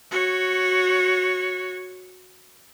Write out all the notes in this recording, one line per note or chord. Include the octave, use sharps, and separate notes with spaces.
F#4 C#5